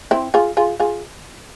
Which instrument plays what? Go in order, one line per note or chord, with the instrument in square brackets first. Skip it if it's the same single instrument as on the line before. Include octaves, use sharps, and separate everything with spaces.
[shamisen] C4 E4
F4 G#4
F4 G#4
F4 G#4